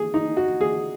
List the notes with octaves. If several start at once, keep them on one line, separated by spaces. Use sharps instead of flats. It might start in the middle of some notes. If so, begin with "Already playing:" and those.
Already playing: G#4
D#4
F#4
G#4